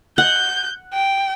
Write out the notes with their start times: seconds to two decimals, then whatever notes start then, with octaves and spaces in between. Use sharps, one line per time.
0.18 F#5 G6
0.93 G5